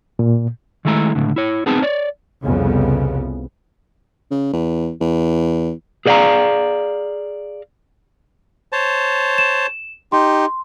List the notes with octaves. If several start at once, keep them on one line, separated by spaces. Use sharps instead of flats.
A#2
D#3 G#3 A3 E4 A#5
C#2 F#2 A2 D3
E4 C#5
B3 C4 D#4 G#4 A5
C#5 D5
C2 F2 C#3 B3
C#3
E2
E2
G#4 A4 D5 E5 F5 A#5
C5 C#5 A5
E7
D#4 G4 C6